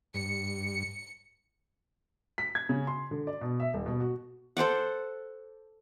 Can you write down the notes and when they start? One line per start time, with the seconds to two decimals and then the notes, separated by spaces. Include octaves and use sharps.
0.14 G2 C#7
2.38 B6
2.55 G#6
2.69 C#3
2.87 C6
3.11 D3
3.27 D5
3.41 B2
3.60 E5
3.74 D#1
3.86 B2
4.00 F#4
4.57 A4 C5 D5 F#5